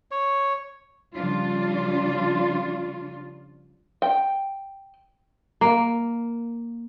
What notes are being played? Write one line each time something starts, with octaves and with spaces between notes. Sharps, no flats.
C#5
C#3 F3 G3 D4 F4
G5
A#3